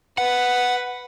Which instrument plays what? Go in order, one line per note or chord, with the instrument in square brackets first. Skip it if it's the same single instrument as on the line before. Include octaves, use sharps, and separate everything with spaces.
[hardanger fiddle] B4 [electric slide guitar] F#5